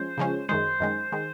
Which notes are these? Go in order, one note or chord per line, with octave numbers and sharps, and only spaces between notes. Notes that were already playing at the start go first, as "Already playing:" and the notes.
Already playing: F3 G#3 C#4 C5
C#3 F3 G#3 C#4
F#2 D#3 G#3 C5
F#2 D#3 G#3
D#3 G#3